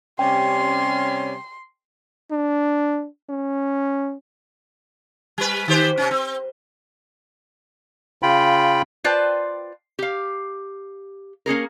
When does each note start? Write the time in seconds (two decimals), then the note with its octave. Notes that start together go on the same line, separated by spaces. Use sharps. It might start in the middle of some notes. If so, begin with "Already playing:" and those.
0.19 C3 G3 C#4 G5 C6
2.31 D4
3.29 C#4
5.38 G3 B4
5.68 D#3 G4 C5
5.98 C3 C#4
6.11 C4
8.23 C#3 F4 G5 B5
9.04 F4 B4 C5 D5 G5 A5
9.99 G4 F5
11.46 A#3 C#4 G#4 A#4